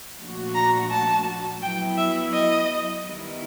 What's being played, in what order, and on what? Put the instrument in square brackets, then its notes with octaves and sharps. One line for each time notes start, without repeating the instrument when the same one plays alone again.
[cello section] A#2 F3 A3 D4 F#4
[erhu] A#5
A5
[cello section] F#3 B3 E4 [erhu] G5
[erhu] E5
D#5
[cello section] D#3 G3 B3 E4